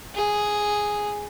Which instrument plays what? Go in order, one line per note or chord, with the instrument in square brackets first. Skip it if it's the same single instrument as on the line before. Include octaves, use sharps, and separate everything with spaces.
[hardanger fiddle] G#4